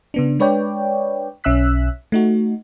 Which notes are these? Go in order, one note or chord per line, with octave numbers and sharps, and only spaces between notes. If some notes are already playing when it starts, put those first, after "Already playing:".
C#3 B3 D4
G#3 D4 B4 C#5 D5 G5
B1 C#4 E5 E6 F#6 B6
A3 D#4 F#4